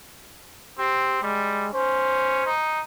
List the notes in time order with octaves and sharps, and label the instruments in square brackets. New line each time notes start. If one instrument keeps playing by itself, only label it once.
[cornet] C4 [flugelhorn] G4
[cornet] G3 [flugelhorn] G#3
[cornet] C#4 [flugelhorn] C5
[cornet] D#4